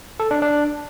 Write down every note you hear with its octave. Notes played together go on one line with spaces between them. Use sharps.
A4
D4
D4